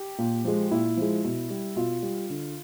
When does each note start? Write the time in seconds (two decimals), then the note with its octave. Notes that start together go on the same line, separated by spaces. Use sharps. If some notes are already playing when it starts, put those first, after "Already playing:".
Already playing: G4
0.18 A#2
0.44 F3 G#3
0.71 A#2 E4
0.97 F3 G#3
1.24 B2
1.50 G3
1.76 B2 F4
2.02 G3
2.30 D3